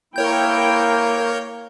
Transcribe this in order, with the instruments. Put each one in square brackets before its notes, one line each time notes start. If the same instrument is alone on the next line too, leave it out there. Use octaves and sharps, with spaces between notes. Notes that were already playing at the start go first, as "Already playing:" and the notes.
[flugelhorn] A#3 [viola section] E4 G5 [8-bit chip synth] A#4 C#5 G6